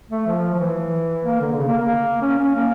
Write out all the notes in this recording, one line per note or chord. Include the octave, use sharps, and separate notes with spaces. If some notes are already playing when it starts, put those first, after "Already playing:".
A3
F3
F3
E3
A#3
D3
D3
C#3
A#3
A#3
C#4
C#4
A#3